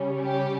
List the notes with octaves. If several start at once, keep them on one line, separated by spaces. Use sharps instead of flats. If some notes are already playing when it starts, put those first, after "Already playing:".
Already playing: C#3 G3 C#4
G4